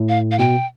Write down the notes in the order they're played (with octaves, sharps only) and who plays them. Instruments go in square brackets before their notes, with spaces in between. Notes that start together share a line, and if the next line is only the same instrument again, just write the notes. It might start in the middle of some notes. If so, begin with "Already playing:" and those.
Already playing: [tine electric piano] A2
[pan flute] F5
F5
[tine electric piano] B2 [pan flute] G5